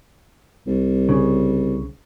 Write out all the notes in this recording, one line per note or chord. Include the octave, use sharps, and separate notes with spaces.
C2
C#3